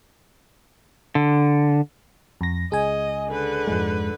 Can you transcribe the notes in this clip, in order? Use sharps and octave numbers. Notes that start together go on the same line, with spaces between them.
D3
F2 A#6
C#2 G#4 D#5 G#5
D3 B4
F2 G#2 G#3